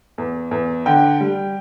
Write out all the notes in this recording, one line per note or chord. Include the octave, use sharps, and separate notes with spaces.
E2
E2
D3 G5
G3